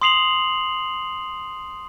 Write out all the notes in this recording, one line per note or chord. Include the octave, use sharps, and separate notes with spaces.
C6 D#6 C7 F7 F#7